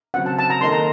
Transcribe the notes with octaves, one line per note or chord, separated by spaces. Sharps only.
C#3 F#3 C4 F#5
A5
A5
A#5
D#3 A#3 D#4 A4 C6
A#5